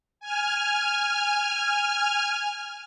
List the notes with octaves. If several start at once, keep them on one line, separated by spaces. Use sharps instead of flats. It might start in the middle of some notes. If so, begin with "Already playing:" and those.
G#5 F6